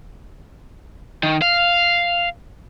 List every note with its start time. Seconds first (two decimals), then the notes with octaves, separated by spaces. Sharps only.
1.23 D#3
1.42 F5